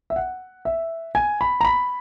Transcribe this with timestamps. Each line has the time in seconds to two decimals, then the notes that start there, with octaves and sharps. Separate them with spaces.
0.10 E5
0.16 F#5
0.65 E5
1.15 G#5
1.41 B5
1.61 A#5
1.65 B5